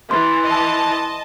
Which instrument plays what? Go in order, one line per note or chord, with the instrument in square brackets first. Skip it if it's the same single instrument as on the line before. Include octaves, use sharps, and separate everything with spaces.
[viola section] E3 [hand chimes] C6 A6
[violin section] D#5 A5